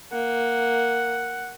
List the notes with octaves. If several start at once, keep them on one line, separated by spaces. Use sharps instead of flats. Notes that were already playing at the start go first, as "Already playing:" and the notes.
A#3 F#5